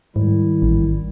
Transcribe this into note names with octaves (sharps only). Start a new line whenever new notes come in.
G#2 D#3 G3 E4
A1